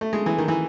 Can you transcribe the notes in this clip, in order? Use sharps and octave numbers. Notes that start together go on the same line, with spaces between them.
A3
G#3
E3
D#3
E3